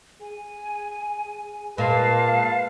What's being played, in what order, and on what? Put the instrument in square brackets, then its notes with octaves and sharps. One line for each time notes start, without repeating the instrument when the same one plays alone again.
[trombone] G#4 [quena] G#5
[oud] A#2 [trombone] G#3 [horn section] B4 A5 [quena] F5